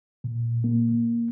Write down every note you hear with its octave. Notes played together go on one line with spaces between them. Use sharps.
A#2
A#3